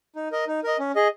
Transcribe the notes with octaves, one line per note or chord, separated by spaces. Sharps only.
D#4
A#4 D#5
D#4
A#4 D#5
C#4
G#4 D#5